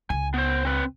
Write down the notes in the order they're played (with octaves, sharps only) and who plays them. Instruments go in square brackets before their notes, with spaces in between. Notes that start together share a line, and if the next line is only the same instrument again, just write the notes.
[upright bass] C#2 [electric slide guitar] G#5
[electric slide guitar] B3 C5
C4 B4